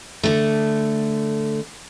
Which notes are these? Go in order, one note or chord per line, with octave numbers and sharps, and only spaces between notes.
D3 A3